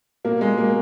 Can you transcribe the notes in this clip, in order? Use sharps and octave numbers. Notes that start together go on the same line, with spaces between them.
B2 A#3
G#3
B2 A#3